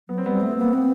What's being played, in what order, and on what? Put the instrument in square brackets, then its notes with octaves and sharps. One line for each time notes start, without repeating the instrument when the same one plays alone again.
[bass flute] F#3 [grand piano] B3
[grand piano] C4
[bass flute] G3 [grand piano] B3
[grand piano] C4
[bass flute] A3 [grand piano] B3
[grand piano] C4
[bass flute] A#3 [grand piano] B3
[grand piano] B3 [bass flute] C4